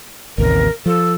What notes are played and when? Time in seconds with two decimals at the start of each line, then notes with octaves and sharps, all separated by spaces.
0.38 A1 D#2 C3 A#4
0.86 F3 A4